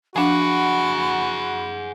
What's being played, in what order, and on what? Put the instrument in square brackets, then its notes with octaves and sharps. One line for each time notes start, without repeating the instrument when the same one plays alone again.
[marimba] F3 D4 [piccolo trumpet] F#4 [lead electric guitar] G#4 F#5 [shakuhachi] B5